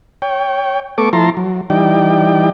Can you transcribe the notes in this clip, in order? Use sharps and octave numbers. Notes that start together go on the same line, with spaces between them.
C#5 G5
A3 B3 A4 C#6 D6
F3 E4 A5 A#5 C6
F#3
E3 G3 D#4 D5 G5